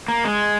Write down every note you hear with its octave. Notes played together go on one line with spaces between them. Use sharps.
A#3
G#3